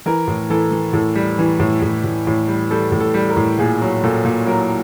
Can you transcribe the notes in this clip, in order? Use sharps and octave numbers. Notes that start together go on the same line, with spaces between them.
E3 A#4
A2
E3 A4
E3
A2 A4
G3
E3
A2
A2
A2
A2
G3
G3 A4
A2
A4
G3
A#4
A2
A#2 G#4
F#3
A#2 A4
A#2
F#3 A#4